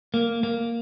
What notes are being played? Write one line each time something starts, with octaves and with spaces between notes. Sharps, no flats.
A#3
A#3